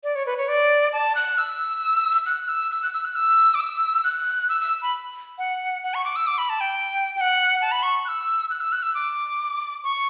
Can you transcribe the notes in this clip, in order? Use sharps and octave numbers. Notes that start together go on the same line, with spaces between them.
D5
C#5
B4
C#5
D5
A5
F#6
E6
F#6
E6
E6
F#6
E6
F#6
E6
D6
E6
F#6
E6
E6
B5
F#5
F#5
C#6
D6
E6
D6
B5
A5
G5
G5
F#5
A5
B5
C#6
F#6
E6
F#6
E6
F#6
E6
D6
C#6